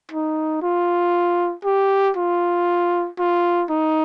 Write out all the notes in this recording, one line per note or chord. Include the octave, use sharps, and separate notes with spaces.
D#4
F4
G4
F4
F4
D#4